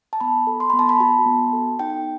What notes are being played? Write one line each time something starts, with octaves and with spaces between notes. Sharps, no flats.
A5
B3 B5
A4
C6
B3 B5
A5
B5
F#4 A5
B3
A4
D#4 G5